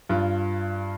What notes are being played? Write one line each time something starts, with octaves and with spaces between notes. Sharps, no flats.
G2 F4